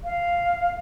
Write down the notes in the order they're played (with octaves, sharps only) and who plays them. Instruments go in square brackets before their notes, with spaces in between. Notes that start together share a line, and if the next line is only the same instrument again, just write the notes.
[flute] F5